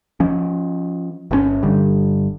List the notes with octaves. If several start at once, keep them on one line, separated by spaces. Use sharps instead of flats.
F3 C#4
G1 C3 C#4
G1 D3 G3